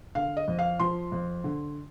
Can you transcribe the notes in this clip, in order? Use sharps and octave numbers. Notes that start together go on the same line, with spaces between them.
D3 F5
D#5
F2
F5
F3 C6
F2
D3